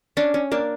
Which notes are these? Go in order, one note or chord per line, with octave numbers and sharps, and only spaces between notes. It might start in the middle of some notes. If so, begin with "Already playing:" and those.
C#4 D4
C#4
A#3 D4